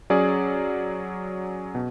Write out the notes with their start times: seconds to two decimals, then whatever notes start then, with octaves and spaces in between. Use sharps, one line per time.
0.10 F#3 C#4 G#4 D5
1.75 B2